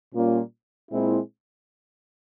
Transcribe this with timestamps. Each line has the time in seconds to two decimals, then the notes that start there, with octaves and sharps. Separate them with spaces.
0.13 A#2 G3 A#3 C#4 F4
0.91 A#2 G#3 C4 E4